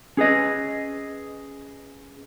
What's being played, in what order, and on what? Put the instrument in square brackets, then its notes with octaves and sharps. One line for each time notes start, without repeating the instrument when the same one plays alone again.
[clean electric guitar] C#4 G#4 B4 D#5